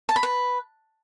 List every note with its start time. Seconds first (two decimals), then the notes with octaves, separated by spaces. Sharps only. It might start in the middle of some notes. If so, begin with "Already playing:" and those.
0.09 A5
0.16 B5
0.23 B4